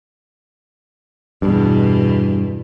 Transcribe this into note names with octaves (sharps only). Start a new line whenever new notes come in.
E2 G2 B2